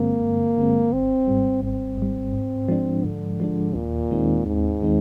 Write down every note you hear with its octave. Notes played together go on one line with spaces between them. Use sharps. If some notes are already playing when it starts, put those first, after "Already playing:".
Already playing: G2 D3 G#3 A#3 C4
G2
D3 G#3 C4
G#1 C4
G#2 G3
G#1 C4
G#2 G3
G#2
F3 G#3 D4
G#2 D3
F3 G#3 D4
D#2 A#2
D#3 G#3 C4 D#4
D#2 G#2
D#3 G#3 C4 D#4